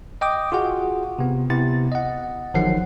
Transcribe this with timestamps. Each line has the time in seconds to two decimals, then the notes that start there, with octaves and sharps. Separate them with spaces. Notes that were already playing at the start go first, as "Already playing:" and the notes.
0.21 D#5 G5 D6 D#6
0.52 F4 F#4 G#4 F#5
1.19 C3 B3
1.50 C3 B3 E4 A6
1.92 D#5 F#5
2.54 G1 D#3 F3 F#3 F#5 C7